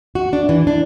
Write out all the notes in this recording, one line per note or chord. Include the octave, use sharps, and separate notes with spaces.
F#4
D4
E3
D4